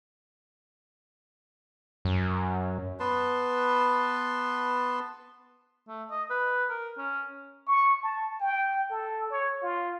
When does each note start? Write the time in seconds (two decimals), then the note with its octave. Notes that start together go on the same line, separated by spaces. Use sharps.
2.05 F#2
3.00 B3 B4 A5 C6
5.88 A3
6.11 D#5
6.30 B4
6.70 A#4
6.98 C#4
7.67 C#6
8.03 A5
8.40 G5
8.91 A4
9.31 C#5
9.62 F4